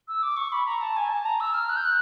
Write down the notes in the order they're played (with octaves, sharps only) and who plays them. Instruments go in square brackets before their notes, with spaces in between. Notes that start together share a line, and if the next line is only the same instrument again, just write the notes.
[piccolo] E6
D6
C#6
B5
A#5
A5
G#5
A5
A#5
E6
F6
F#6
G6
F#6